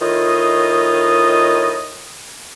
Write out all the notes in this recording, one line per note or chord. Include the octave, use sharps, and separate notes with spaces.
A2 D#3 F4 D#5